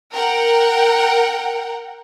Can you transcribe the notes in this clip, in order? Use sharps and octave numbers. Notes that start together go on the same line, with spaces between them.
A#4 F#5 G5